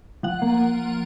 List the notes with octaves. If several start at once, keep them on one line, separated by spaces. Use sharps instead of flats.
F3 F#5
A#3